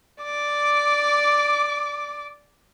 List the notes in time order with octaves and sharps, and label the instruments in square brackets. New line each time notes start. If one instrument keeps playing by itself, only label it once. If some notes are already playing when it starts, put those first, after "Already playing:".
[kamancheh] D5 D6